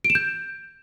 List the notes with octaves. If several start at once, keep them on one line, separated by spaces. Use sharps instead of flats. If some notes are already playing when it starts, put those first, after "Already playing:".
D7
E7
G6